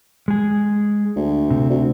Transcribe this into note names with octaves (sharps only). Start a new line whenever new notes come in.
G#3 G#4
D2
C3
D2